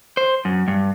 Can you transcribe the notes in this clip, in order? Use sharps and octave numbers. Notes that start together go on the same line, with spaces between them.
C5
F#2
G2